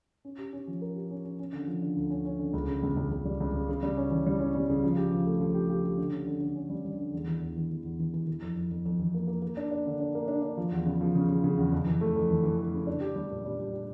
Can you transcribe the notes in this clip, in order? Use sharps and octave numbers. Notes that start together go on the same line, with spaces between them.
C#4
G4
C#4
F3
A#4
G4
C#4
C#4
C#4
D3
F3
D3
D2
C#4
C#4
D3
C#2
C#3
C#2
C#2
C#2
G3
C#2
C#3
C#3
G3
C#4
E3
G3
C#4
G3
C#3
F3
G4
F3
A3
F3
G4
G4
G4
D3
C#4
D3
D3
C#4
G3
G3
D3
E2
E3
E2
E3
E3
E2
E3
E3
E3
F2
F2
F2
F2
E3
A#3
A#3
A#3
D4
D4
D3
D4
A#3
D4
D4
F3
E2
C#3
F3
C#3
C#3
C#3
E2
F2
E3
A3
F2
E3
E3
A3
C#3
D4
G4
G3
A#2
G3
G4
G4